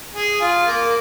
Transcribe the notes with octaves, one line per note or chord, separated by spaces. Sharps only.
G#4
F4
A#3